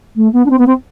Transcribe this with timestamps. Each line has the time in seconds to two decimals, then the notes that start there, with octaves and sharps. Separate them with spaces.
0.15 A3
0.32 B3
0.45 D4
0.49 C4
0.58 B3
0.66 C4